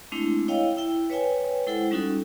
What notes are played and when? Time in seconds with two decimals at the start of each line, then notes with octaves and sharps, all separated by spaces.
0.12 G#3 A3 C4 D4 E4
0.48 E4 C#5 D#5 F5 G5
0.77 E4 E5 G5
1.10 B4 C#5 E5 G5 G#5
1.67 G#3 E4 A4 C5 F#5 G5
1.91 G3 C#4 D#4 F4 F#4 A4